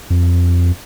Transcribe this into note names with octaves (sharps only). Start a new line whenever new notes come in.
F2